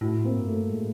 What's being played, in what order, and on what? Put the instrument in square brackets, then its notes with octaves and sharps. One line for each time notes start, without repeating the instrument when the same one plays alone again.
[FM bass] A2 [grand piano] E4 F#4
[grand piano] A#3 C4
[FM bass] G2
[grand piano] A3
[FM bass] A2 [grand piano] G#3 A#3